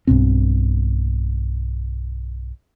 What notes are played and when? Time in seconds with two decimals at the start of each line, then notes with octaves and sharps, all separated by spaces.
0.07 B1 G2 B2 C4